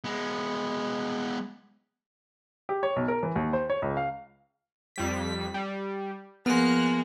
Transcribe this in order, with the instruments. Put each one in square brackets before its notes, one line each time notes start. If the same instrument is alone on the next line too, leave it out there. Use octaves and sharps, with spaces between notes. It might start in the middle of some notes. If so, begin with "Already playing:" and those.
[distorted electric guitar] G#3 B3
[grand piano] G4
C#5
B1
A#4
E3
D#2
C5
C#5
C#2
F5
[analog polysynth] F2 G3 B6
G3
[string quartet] F3 G#3 A#3 [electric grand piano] B3 [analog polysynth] F6 F#6